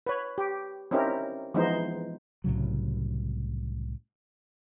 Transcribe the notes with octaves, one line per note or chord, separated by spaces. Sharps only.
B4 C#5
G4
C4 C#4 D#4 E4 G4 A#4
E3 F3 G#3 B3 D#4 C5
C2 A2 C#3 F#3